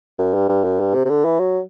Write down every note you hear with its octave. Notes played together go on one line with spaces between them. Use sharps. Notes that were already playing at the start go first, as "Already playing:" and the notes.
F#2
G2
G2
F#2
G2
C3
C3
D3
E3
F#3